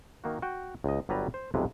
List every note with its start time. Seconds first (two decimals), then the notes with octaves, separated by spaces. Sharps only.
0.24 D#3 A#3 F#4
0.42 F#4 G5
0.84 C#2 D#5
1.09 G1 F#3 G3 B4 A5 A#5
1.34 C5
1.54 B1 F2 C3 G#3 B4